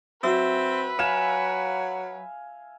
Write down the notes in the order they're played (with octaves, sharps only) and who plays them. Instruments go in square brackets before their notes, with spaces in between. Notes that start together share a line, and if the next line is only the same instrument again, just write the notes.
[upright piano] F#3 F#4 [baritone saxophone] C4 [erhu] B4 [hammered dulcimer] E5
[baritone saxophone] F#3 [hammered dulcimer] F5 G#5 [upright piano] E7